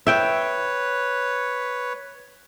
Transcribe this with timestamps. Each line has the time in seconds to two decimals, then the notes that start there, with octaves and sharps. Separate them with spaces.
0.07 B4 C#5 E5 G5